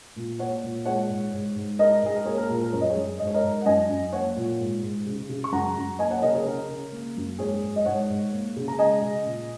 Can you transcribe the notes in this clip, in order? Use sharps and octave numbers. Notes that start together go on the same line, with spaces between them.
A#2
A#3 C#5 F#5
A#2
G#3 C#5 F#5
G#2
G#2
G#2
G#3 A#4 D#5
G#2 G#4
A#4
A#3 G#4 C#5
A#4
A#2 G#4
A#4
F#2 C#5
D#5
G#4 C#5
F#2
G#2 D#5
C#5
A#4 D#5
G#2
F#5
F#2 D#5 G#5
F#2
A#3 C#5 F#5
A#2
G#2
G#2
C#3
C#3
C#6
F#2 F#5 A#5
F#2
A#3 D#5 G#5
C#5 F#5
C#3 A#4 D#5
G#4 C#5
C#3 A#4
C#3
A#3
F#2
G#2 G#4 C#5
G#2
D#5
G#2 C#5 F#5
G#2
A#3
C#3
A#5
G#3 D#5 G#5
C#3
A#2